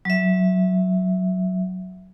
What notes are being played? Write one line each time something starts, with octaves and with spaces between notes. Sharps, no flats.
F#3 E5